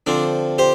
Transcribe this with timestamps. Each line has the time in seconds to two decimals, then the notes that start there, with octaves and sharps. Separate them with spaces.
0.06 D3 F3 C4 D4
0.58 G4 C5